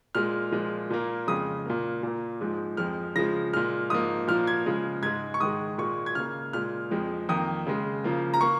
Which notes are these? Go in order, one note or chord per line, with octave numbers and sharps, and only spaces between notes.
A#2 G#3 F6
A#2 F3 G#3
A#2 A#3
F2 C#3 G#3 D#6
A#2 A#3
A#2 A#3
G#2 F3 G#3
F2 F3 G#3 F6
C#3 F3 G#3 A#6
A#2 G#3 F6
G#2 F3 A#3 D#6
A#2 F3 A#3 F6
G#6
C#3 F3 G#3
G#2 G#3 G#6
C#6
G#2 D#3 G#3 D#6
A#2 G#3 C#6
G#6
C#3 A#3 F6
A#2 G#3 F6
F2 F3 G#3
F2 D#3 A#3 D#6
C#3 G#3
C#3 F3 A#3
A#5
A#3 C#6